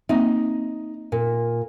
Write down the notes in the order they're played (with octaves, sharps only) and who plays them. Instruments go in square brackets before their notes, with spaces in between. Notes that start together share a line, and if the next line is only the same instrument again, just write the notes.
[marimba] A#3 C4 E5 [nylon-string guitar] D#4 D#5
[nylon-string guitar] A#2